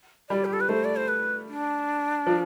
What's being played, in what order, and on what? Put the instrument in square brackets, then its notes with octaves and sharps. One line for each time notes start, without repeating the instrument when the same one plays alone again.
[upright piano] G3 [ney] D5
[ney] G4
A4
B4
[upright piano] A3 [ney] C5
[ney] D5
C5
B4
D4
[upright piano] F3